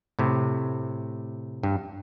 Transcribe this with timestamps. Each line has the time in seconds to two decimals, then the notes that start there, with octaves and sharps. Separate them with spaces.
0.19 A2 C3
1.63 G2